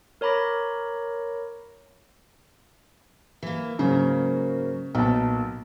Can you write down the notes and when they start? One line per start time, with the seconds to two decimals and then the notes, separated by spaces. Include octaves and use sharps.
0.21 A#4 C#5 A#5 B5 D6 A#6
3.43 E3 A#3
3.79 G#2 C#3 F#3 A#3
4.95 B1 A#2 A5